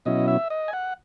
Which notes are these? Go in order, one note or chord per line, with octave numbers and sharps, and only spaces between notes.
B2 F#3 C#4 E4 D#5
E5
D#5
G#5
F#5